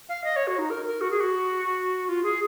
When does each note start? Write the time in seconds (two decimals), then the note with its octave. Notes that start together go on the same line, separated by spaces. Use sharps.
0.09 F5
0.24 D#5
0.36 C#5
0.47 F#4
0.58 D#4
0.70 A#4
0.85 A#4
1.01 F#4
1.11 G#4
1.20 F#4
2.09 F4
2.23 G#4